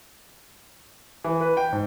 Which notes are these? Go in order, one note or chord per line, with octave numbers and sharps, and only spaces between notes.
E3
B4
G5
G#2